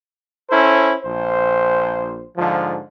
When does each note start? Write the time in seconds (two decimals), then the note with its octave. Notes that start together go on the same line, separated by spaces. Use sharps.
0.51 C#4 E4 A4 C5
1.03 A#1 C5
2.36 G#2 D3 F3